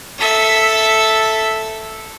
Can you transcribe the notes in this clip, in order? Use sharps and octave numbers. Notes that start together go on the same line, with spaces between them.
A4 E5